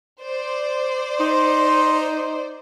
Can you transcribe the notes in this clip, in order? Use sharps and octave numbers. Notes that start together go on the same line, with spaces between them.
C5 D5
D#4 C6